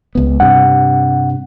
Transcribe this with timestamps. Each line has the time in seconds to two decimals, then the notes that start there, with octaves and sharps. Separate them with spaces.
0.15 C#2 B3
0.40 G2 C3 F#5